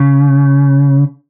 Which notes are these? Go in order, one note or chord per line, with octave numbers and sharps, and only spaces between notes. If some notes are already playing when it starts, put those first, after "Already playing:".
Already playing: C#3